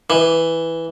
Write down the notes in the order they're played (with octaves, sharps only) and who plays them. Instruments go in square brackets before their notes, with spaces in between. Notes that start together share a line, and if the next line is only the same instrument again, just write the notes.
[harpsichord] E3